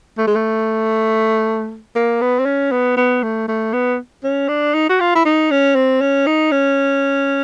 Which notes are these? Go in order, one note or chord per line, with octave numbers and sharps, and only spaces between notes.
A3
G#3
A3
A#3
B3
C4
C#4
B3
B3
A3
A3
B3
C#4
D4
D#4
F#4
F4
E4
D#4
C#4
C4
C#4
D#4
C#4